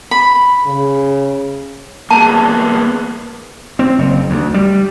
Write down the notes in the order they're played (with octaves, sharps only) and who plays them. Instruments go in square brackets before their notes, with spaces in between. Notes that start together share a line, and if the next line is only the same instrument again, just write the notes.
[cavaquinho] B5
[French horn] C#3
[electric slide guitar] A#3 B3 G#4 [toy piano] A5
[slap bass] C4
F#1
D2
G3